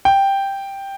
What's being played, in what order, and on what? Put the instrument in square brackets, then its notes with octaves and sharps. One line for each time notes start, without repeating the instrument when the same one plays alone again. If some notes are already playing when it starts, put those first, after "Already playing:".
[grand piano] G5